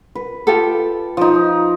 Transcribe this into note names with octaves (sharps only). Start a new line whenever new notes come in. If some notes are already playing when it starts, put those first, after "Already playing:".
B4
F4 G4 A4
F3 D#4